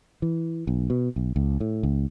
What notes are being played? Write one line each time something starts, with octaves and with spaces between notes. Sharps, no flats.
E3
B1
B2
B1
C#2
A2
C#2